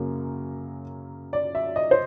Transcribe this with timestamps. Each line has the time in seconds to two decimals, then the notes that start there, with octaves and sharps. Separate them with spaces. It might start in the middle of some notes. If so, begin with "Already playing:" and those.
Already playing: F#2 C#3 F#3 A#3
1.33 D5
1.55 E5
1.76 D#5
1.91 C5